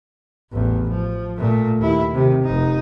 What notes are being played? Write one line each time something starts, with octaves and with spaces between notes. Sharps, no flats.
A1 E2
F3
A#2 A3
D#2 E4
C3 D#3
F1 D#4